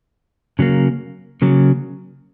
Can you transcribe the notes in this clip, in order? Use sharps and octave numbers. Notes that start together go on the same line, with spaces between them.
C#3 F#3 A#3
C#3 F#3 A#3